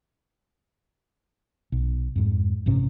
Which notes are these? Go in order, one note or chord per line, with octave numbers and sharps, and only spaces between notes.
B1
F2 G#2
A1 G2 C3 C#4